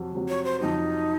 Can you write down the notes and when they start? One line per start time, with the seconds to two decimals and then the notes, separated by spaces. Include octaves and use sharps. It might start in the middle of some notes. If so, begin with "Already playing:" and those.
Already playing: F2 C3 F#3
0.12 F2 C3 F#3
0.29 C#5
0.45 C5
0.61 F2 C3 F#3 D#4